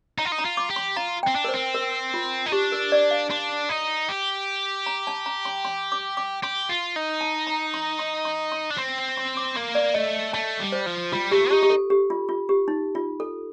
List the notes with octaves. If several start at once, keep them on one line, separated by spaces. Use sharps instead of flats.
D#4 A#5
F4
D#4
A#5
F4
D6
G4
C6
F4 A#5
G5
C4
D4
A#4
C5
C4
A#4
F4
D#4
D4 G4
A#4
D5
F5
D4 C6
D#4
G4
A#5
A5
A#5
C6
C6
D6
D6
G4 C6
F4
D#4
A5
A#5
C6
C6
C6
C6
D4
C4 C6
C6
D6
A#3 C6
D5
A3 D#5
A3 A5
G3
C5
F3
G3 F4
A3 G4
D#4 G4
G4
A4
G4
F4
F4
G4
D#4
F4
A4